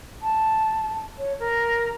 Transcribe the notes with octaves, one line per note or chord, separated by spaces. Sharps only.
A5
C#5
A#4